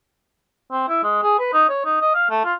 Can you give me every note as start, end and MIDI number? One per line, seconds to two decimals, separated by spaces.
0.71 0.88 60
0.88 1.02 64
1.03 1.18 56
1.23 1.36 68
1.39 1.49 71
1.53 1.64 63
1.69 1.84 73
1.85 1.97 63
2.01 2.13 75
2.15 2.27 77
2.30 2.40 57
2.45 2.54 65